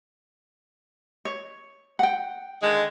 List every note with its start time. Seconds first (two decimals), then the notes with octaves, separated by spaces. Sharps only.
1.25 C#5
1.99 F#5 G5
2.62 D3 D#3 G#3